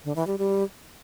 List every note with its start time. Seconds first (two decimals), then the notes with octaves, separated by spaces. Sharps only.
0.04 D3
0.16 E3
0.27 G3
0.38 G3